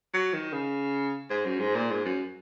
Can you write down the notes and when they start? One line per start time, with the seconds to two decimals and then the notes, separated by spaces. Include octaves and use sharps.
0.14 F#3
0.33 D#3
0.53 C#3
1.30 G#2
1.45 F#2
1.59 G#2
1.75 A#2
1.91 G#2
2.05 F#2